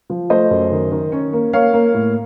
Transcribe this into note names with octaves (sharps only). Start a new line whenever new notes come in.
F3
A3 C5 D#5
F#2
D#3
D#3
C#4
A#3
A#3 C#5 F5
A#3
A2